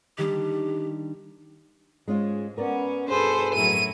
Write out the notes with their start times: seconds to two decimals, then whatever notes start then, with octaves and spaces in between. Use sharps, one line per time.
0.18 D#3 G3 D4 G4
2.08 G#2 G#3 C#4 F4
2.58 B3 C#4 A#4 D5
3.09 G2 B2 G#4 A4 B4 C5
3.54 F#2 A2 F#3 E4 A#4 D#7